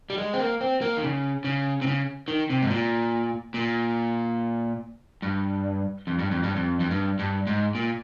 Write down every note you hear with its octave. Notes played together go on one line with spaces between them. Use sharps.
G3
G#3
C4
A#3
C4
A#3
D#3
C#3
C#3
C3
C#3
D#3
C3
G#2
A#2
A#2
G2
F2
G2
F2
G2
F2
F2
G2
G2
G#2
A#2